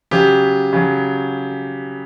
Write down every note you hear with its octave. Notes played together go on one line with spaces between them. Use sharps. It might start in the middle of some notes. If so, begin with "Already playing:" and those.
C#3 F#3 G4
C#3 F#3